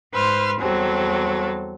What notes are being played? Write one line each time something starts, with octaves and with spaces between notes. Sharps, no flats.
G#2 B4 C5 C6 F6
E2 F#3 G3 C4 A4